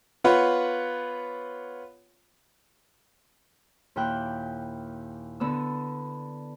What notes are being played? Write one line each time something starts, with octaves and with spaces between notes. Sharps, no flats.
B3 F4 B4 C#5 F#5
D#2 A#2 E4 G5 F#6
D3 B3 E6